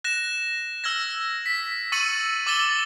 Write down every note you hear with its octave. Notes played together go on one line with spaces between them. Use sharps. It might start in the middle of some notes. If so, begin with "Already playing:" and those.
F#6 A#6 E7
E6 F6 G#6 A#6
B6
C#6 E6 A6 C#7 D#7 F#7
D6 E6 A6 G7